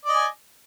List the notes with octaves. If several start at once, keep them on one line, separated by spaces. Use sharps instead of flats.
D5 D#5 G#5